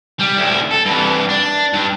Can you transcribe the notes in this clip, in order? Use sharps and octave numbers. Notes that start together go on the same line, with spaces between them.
G3
D2 E4
A4
G2 E3
D4
G2